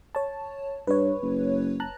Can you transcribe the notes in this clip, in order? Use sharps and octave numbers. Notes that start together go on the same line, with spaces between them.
C#5 A5
G2 B4 C#5
F#1
A5 A#5 F#6